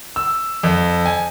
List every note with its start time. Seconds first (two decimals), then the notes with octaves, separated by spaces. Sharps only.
0.16 E6
0.63 F2
1.05 G#5